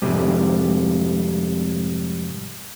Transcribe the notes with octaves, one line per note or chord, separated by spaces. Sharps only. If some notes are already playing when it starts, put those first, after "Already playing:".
F2 G#2 C3 G3